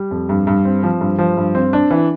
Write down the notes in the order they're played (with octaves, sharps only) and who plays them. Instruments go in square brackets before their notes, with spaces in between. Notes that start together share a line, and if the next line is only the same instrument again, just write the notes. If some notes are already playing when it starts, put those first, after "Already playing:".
Already playing: [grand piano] G3
F2
G2
G2
C4
F3
G2
F3
G2
C4
D4
E3